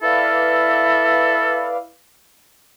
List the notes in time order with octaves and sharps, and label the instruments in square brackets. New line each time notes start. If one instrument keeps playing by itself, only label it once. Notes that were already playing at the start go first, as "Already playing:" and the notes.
[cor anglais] E4 [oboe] A4 [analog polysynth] B4 D5 F5